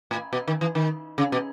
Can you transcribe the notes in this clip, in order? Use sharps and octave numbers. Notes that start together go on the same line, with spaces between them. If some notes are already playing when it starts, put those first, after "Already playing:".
A2
B2
D#3
E3
D#3
C#3
B2